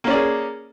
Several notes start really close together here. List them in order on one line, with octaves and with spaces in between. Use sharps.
A#3 C#4 D5 G#4